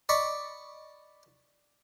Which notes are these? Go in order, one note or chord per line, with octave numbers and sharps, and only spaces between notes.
D5 D#5 B5 C#6 D6